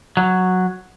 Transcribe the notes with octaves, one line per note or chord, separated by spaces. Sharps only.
F#3